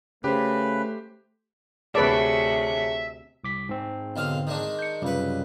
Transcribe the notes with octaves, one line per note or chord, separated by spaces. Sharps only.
C#3 A3 G4 B4 C5
D2 C3 G#4 B4 C#5 D5 E5 A5
C2 D6 B6
G#2 C4
B1 D3 F5
D#3 G#3 D4
G6 C#7
C#2 F#2 C3 G3 B4